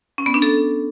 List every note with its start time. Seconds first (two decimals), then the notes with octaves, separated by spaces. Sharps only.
0.18 C#4
0.26 B3
0.34 D4
0.42 A4